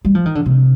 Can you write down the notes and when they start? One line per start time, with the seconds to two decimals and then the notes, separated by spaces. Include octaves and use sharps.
0.05 G3
0.15 F3
0.26 D#3
0.35 D3
0.46 C3